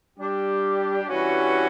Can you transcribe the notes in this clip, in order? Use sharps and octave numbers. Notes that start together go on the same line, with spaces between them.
G3 D4 G4
G2 E3 G3 C#4 F#4